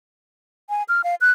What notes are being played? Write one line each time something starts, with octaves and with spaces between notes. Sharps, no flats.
G#5
F6
F5
F#6